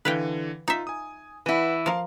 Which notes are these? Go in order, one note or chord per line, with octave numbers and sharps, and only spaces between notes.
D3 E3 B4 F5 G5
D#4 F4 E5
G#5 D#6
E3 E4 B4 F#5
F3 A#4 F5 C6